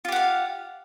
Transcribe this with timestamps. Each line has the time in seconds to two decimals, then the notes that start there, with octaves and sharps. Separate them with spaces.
0.05 F4
0.08 G4
0.12 F#5
0.16 F5